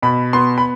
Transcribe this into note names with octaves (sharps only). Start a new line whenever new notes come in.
B2 B5
B3 C6
B5